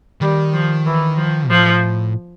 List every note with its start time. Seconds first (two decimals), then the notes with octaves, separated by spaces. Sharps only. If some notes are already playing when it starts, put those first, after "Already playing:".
0.21 D#3 G3
0.54 F3
0.86 E3
1.17 F3
1.49 A2 F3